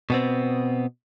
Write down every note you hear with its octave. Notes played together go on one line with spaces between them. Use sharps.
B2 B3 C4